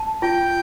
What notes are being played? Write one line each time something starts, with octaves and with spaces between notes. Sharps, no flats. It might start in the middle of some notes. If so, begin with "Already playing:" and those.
Already playing: A5
F4 G5